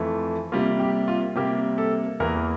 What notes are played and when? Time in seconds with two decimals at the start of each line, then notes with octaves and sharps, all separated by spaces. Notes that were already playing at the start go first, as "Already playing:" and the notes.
Already playing: F2 E3 A3
0.52 C3 G3 A#3 F4
0.80 G4
1.08 F4
1.36 C3 G3 A#3 G4
1.78 A4
2.20 E2 E3 A#3 A#4